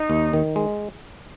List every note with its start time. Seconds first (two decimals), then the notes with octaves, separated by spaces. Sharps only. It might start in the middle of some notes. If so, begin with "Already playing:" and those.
Already playing: D#4
0.10 D#2
0.33 D#3
0.56 G#3